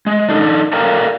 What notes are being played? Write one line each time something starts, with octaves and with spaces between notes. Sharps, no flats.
G#3
D4 D#4 A4
A4 A#4 D5 F5 G5 A#5